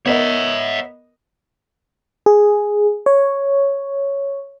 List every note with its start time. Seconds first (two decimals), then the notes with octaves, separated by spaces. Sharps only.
0.06 B3 A#4 C#5 D#5 E5
2.26 G#4
3.06 C#5